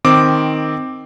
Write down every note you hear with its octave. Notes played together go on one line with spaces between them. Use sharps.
D#3 C4 D6